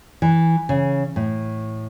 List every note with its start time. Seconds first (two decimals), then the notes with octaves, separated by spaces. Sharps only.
0.22 E3
0.69 C#3
1.16 A2